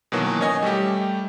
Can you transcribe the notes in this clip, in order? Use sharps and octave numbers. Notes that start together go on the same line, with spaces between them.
B2 D#3 E3 F#3 A#3
C#4 C#5 D#5 G#5
G3 A3 G4